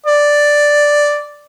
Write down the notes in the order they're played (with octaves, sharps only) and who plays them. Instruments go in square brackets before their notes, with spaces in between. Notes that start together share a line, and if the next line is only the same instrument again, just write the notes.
[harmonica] D5